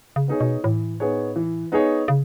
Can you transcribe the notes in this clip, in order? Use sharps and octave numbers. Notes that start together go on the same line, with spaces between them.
C#3
B3 D#4 G#4 C#5
B2
A2 E3
B3 D#4 G#4 C#5
E3
B3 D#4 G#4 C#5
C#3